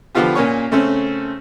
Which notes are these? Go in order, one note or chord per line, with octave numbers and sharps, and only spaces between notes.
D3 F3 B3 F4 G4
A#2 A#3 C#4 C#5 C#6
C#3 A3 C4 C#4